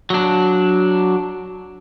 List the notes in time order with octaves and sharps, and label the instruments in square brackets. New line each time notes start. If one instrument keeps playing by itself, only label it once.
[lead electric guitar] F#3 D4